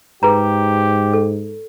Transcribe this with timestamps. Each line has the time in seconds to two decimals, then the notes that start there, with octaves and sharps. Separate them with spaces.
0.23 G#2 G4 G#4 B4 A#5
1.13 A4